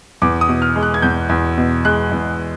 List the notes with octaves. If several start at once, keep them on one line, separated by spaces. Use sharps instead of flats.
E2 D6
D#6
B2
F6
G#3
F#6
G#6
E2 G6
E2
B2
G#3 F#6
E2